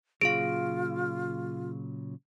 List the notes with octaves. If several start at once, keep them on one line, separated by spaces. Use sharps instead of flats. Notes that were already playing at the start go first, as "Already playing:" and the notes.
A#2 C#3 F#3 F4 G#4 F5 D7